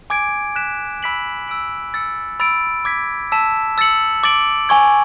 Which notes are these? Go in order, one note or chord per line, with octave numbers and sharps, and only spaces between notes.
G#5 D6 G#6 D7
F#6 B6 E7
B5 E6 B6 D7 F#7
E6 B6 D7 F#7
E6 A6 C#7
B5 E6 A6 D7
D6 G#6 B6
A5 E6 B6 E7
E6 A6 C#7 F#7
D6 A6 D7 F#7
G#5 C#6 G#6